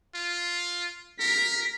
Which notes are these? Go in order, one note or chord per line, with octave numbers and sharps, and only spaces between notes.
F4
A#4 B6